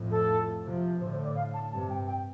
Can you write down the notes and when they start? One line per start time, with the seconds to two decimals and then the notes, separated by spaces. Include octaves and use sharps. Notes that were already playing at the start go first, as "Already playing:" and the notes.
Already playing: F2 A2
0.11 A4
0.64 C3 F3
1.00 A2 D3 C5
1.13 C5
1.24 D5
1.36 F5
1.54 A5
1.72 G2 C3 A5
1.90 G5
2.07 G5